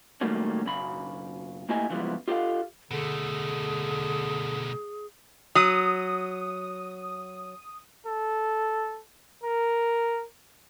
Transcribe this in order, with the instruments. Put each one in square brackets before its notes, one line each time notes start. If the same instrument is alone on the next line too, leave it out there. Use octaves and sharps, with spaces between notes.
[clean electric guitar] D#3 F#3 G3 A3 A#3 C#4
B1 F#2 C#3 B5
A2 A#3 E4 G4 D#5 G#5
C#3 E3 F3 G3 G#3 B3
F4 G4 A4 C5 D#5 F5
[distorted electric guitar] B2 A3 [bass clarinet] D3 [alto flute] G#4
[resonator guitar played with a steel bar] F#3 [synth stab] D#6
[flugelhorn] A4
A#4